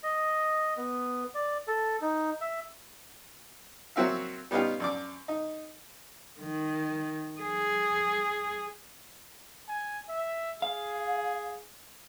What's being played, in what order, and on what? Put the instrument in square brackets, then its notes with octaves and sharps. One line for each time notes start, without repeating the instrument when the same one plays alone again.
[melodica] D#5
B3
D5
A4
D#4
E5
[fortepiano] F#3 A#3 C4 F#4 E5 F5
G3 B3 C#4 D#4 F4 G4
F#2 D5 D6
D#4
[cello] D#3
G#4
[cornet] G#5
E5
[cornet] G#4 [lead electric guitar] F5